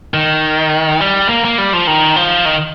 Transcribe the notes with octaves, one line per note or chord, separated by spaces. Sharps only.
D#3
G3
A#3
A#3
G3
F3
D#3
F3
D#3